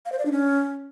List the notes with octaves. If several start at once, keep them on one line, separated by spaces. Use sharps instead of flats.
F5
C5
D5
D4
C#4